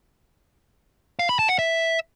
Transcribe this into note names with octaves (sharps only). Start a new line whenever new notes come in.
F5
B5
A5
F#5
E5